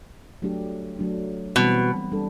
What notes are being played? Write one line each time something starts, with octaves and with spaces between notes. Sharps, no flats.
F#3 A3 D4 G4
F#3 A3 D4
B2 E3 G3 C4
G3 D4 A4